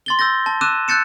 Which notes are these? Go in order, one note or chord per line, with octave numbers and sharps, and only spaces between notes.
C6 A6 G7
E6 G6 A6 A#6
A5
D6 E6 F#6 D#7 E7
E6 F#6 G6 A6 C#7 E7